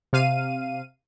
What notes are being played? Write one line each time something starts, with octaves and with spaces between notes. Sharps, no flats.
C3 F5 D#7